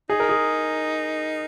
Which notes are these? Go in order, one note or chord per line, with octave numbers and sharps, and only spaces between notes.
D#4 G#4
A#4
G#4